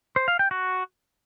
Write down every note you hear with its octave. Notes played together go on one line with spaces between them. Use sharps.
C5
F5
G5
F#4